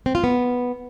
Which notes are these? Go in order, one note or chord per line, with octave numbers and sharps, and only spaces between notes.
C4
F4
B3